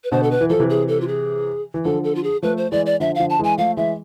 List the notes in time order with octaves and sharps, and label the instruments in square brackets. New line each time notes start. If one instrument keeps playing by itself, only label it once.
[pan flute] B4
[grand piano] B2 D3 [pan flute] C5
[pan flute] A4
B4
[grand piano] E3
[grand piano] F3 [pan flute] A4
[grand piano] C3 E3
[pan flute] G#4
A4
F4
G#4
[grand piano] E3
[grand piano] D3 F3 [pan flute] A4
[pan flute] A4
F4
G#4
[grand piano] F3 A3 [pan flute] B4
[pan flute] C5
[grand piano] E3 G#3 [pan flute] D5
[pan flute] D5
[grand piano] D3 F3 [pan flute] E5
[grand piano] D3 F3 [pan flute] F5
[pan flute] A5
[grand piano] E3 G#3 [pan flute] G#5
[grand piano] F3 A3 [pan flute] F5
[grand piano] E3 G#3 [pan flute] E5